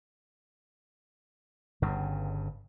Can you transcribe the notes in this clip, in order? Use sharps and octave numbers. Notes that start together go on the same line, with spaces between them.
G1 G2 C#3